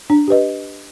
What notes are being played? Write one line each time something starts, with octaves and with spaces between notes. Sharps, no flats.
D4
G4 B4 D#5